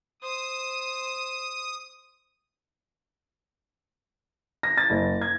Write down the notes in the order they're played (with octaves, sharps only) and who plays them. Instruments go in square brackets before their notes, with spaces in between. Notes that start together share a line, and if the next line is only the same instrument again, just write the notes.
[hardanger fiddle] C5 [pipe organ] D#6
[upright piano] A#6
A6
F#1
G#6